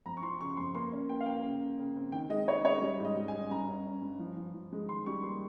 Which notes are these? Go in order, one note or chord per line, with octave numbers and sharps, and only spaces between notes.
F2 A#5
C#6
F3 C6
C#3 C#6
F2 C6
A#3 C6
C#4
A#3 G5
F5
A#3 G5
C#3
C#3
C#3
C4
D#3 G5
G#3 D#5
G#3 C#5
G#3 C#5
G3 D#5
G#2 D#5
G3
G#5
C#4
G2 A#5
C#4
C#4
G2
F3
F3
F3
G#3
D#3 C6
G3 C#6
A#3 C6